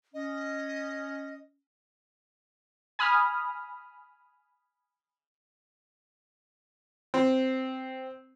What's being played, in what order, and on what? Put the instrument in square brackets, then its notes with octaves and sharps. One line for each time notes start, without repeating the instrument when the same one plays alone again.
[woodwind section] C#4 [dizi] D#5
[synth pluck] G#5 B5 D#6 F6
[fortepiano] C4